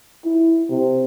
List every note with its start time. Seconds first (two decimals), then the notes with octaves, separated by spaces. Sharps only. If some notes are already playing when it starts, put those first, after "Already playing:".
0.25 E4
0.70 C3